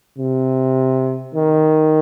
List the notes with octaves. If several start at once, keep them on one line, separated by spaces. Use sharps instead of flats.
C3
D#3